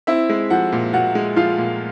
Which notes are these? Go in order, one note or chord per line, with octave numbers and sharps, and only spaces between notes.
C4 E4 E5
G#3
F3 F#4 F#5
A#2
A#2 F#4 F#5
G#3
F3 F4 F5
A#2